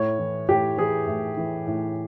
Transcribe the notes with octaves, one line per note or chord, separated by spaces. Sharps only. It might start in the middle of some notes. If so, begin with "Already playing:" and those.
Already playing: A2 C#5
E3
A2 G4
E3 G#4
A2
E3
A2